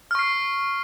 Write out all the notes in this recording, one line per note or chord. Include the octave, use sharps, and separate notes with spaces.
C#6 F6 C7